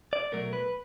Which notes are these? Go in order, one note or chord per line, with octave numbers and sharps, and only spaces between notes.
D5
B2 F#3 A3 A#4
B4